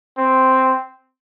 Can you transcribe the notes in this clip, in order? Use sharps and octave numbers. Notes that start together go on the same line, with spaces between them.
C4